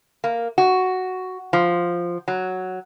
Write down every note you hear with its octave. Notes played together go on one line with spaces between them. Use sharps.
A#3
F#4
F3
F#3